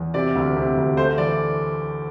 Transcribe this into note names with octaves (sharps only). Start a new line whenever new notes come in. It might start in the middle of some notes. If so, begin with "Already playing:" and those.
Already playing: E2
C3 D5
D2
C3
D2
A3 C5
E3 D5